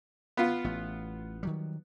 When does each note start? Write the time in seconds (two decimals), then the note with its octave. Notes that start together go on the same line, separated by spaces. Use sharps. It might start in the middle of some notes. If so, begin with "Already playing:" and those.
0.37 B3 F4
0.64 A1 A3
1.43 D#3 F#3 G3